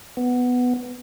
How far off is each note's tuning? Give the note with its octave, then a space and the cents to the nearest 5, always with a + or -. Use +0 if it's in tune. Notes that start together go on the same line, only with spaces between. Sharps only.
B3 +5